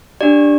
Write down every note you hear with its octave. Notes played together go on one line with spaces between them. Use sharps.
D4 G4 D5